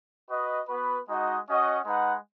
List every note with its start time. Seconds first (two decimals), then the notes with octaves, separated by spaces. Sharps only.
0.30 F#4 B4 D#5
0.69 B3 F#4 B4
1.09 G#3 D#4 F#4 D#5 F#5
1.48 C#4 F#4 D#5 F#5
1.86 G#3 D#4 B4 F#5